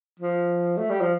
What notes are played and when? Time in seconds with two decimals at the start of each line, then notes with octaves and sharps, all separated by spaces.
0.19 F3
0.77 A3
0.90 G3
1.01 F3